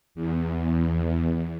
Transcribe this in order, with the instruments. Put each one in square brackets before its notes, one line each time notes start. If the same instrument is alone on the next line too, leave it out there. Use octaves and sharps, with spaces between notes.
[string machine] E2